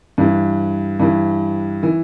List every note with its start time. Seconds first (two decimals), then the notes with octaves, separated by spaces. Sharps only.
0.18 G2 E3
1.00 G2 E3
1.83 E3